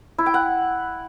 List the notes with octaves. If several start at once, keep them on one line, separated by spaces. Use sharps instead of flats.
E4
G5
F#5